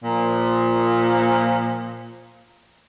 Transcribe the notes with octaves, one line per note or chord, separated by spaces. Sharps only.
A#2 F3